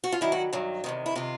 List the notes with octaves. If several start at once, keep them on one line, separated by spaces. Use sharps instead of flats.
F#4
F4
G2 D#3 F#3 E4
F#4
G2 D#3 F#3
E2 C3 D#3
E4
C3 D#3 F4